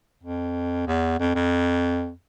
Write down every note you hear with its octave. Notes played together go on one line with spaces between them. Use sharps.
F2
E2
F2
F2